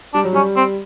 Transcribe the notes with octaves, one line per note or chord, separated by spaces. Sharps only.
G3 D4
F#3
G3 C#4
C4